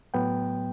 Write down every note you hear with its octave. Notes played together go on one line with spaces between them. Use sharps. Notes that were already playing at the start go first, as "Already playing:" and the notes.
A2 F#3 B3 G5